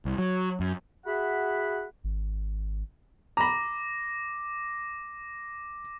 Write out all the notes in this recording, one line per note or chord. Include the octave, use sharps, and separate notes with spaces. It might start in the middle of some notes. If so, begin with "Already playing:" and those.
C2
F#3
F#2
F#4 G#4 E5 F#5 B5
G#1
A#5 B5 D6 A#6